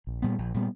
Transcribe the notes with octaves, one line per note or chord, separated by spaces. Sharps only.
A#1
A#2 G3 B3
A#1
A#2 G3 B3